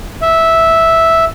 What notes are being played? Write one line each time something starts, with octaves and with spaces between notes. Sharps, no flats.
E5